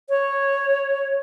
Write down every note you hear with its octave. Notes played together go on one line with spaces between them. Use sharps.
C#5